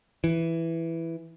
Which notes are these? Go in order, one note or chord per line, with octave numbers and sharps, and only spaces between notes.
E3